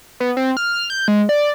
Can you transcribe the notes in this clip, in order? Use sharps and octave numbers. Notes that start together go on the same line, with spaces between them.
B3
C4
F6
G6
G#3
D5